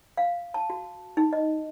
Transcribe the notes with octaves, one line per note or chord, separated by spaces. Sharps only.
F5
A5
F#4
D#4
D#5